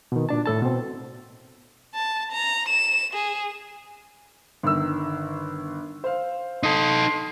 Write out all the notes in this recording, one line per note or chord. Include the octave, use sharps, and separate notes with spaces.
B2 D#3
A#2 D4 A5
A2 A4 A5
B2 C4
A5
A#5
E7
G#4
G1 D#3 E6
C5 F5
D#4 A4 C6 D#6